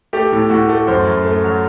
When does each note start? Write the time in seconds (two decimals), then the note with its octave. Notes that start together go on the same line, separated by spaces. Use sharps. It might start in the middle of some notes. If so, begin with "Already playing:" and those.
0.13 A3 G4
0.32 A2
0.50 A2 F#4
0.69 A3
0.87 F#2 C5
1.07 F#2
1.25 A3
1.44 F#3